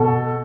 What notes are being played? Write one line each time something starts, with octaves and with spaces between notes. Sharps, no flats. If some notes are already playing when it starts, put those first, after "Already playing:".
Already playing: B2 A4